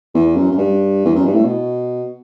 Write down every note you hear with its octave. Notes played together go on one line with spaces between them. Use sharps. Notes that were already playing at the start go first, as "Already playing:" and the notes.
E2
F#2
F#2
G2
E2
F#2
G2
A2
B2